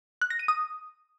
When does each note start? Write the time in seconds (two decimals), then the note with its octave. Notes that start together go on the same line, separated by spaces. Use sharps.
0.22 F#6
0.30 A#6
0.39 D#7
0.48 D#6